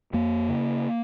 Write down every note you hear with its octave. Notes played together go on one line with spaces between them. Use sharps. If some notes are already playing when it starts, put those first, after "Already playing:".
F2 A#3
C#3